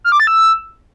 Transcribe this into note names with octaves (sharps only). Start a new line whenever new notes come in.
F6
D6
A6
E6